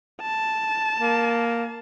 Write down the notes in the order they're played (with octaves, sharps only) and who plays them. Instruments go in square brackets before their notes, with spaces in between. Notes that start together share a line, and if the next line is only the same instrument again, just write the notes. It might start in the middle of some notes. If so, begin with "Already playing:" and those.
[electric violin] A5
[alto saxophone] A#3